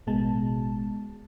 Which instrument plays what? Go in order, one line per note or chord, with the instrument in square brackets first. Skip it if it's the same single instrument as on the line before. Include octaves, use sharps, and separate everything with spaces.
[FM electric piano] A1 B2 G#3 A5